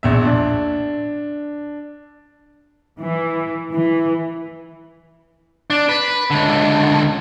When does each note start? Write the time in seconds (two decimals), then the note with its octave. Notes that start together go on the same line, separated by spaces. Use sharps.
0.03 A#1 E2 E5
0.25 D4
3.00 E3
3.73 E3
5.70 D4
5.89 B4
6.30 C#2 D3